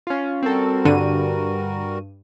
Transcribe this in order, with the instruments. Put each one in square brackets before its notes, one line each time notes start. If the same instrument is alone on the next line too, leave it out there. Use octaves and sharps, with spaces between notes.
[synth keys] C#4 F4
[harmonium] G3 F#4 A#4 [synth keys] C4 A4
[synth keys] G2 D#7 [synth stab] D3